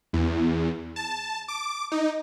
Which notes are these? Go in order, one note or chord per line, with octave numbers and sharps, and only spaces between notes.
E2
A5
D6
D#4